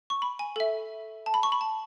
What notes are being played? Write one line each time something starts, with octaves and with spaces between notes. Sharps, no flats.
C#6
B5
G#5
A4 E5
A5
B5
C#6
B5
A5